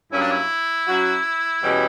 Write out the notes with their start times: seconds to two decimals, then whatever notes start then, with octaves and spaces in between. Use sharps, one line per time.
0.12 G2 F#3 A#3 C#4 E4
0.22 D4
0.31 E4
0.87 F#3 C#4 F#4
1.63 E2 B2 G3 C#4